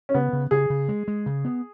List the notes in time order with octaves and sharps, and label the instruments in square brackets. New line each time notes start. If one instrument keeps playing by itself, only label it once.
[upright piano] C#4
[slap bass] C#3 [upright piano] B3
[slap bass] C#3
[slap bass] C#3 [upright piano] G#4
[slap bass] C#3
G#3
G#3
C#3
B3